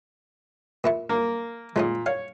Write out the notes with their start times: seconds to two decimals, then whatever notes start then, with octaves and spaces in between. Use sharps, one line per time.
0.84 A#2 E4 C#6
1.09 A#3
1.76 A#2 G#3 C#4 D#4
2.06 C#5 F5